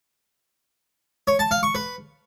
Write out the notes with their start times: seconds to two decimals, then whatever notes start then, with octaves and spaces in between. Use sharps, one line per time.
1.27 C#5
1.39 A5
1.51 F5
1.63 C#6
1.75 B4